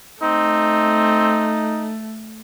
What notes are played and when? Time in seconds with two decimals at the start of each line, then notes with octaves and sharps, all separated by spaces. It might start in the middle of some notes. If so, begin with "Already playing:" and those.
0.22 A3 C4 D#4